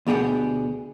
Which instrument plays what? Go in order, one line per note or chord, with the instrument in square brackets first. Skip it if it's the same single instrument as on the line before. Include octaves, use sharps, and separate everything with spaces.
[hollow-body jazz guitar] D2 B2 G4 G#4 F#5